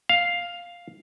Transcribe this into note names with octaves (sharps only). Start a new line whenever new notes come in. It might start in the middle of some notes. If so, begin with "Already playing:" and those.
F5